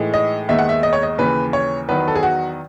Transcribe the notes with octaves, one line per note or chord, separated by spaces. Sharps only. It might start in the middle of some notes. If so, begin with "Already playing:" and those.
Already playing: A2 E3 G#3 D#4
D#5
D#2 D#3 G#3 B3 D#4 E5
F#5
E5
D#5
C#5
D#5
D#2 C#3 E3 B4
C#5
E2 D#3 F#3 B3 B4
A4
G#4
F#4